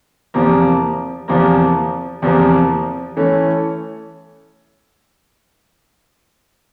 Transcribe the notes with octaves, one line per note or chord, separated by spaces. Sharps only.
E2 C3 F3 A#3
E2 C3 F3 A#3
E2 C3 F3 A#3
E3 A3 C#4